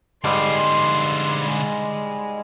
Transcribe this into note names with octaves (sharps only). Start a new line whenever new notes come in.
G#2 D3 G3 G#4 C6
G#3